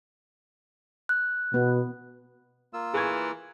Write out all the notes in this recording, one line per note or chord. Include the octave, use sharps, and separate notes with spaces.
F#6
B2 B3
A#3 F4 E6
E3 G#4 C#6 G#6